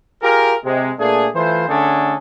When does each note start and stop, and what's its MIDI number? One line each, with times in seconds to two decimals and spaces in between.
0.22 0.54 65
0.22 0.54 67
0.22 0.54 68
0.22 0.54 70
0.65 0.91 48
0.65 0.91 56
0.99 1.28 46
0.99 1.28 57
0.99 1.28 62
0.99 1.28 68
1.35 1.68 52
1.35 1.68 57
1.35 1.68 65
1.35 1.68 72
1.69 2.15 50
1.69 2.15 57
1.69 2.15 61
1.69 2.15 62
1.69 2.15 68
1.69 2.15 69